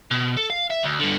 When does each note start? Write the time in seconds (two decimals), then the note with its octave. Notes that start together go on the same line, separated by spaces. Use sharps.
0.11 B2
0.37 A4
0.50 F5
0.70 E5
0.83 D2
0.99 G2 D3